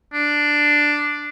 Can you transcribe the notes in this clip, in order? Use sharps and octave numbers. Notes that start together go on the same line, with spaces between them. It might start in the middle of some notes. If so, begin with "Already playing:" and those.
D4